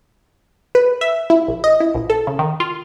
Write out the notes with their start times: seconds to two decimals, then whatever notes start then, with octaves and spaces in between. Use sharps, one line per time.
0.75 B4
1.01 E5
1.30 E4
1.48 A#1
1.64 D#5
1.80 E4
1.94 A#1
2.10 A4
2.27 C#3
2.39 D#3
2.60 F4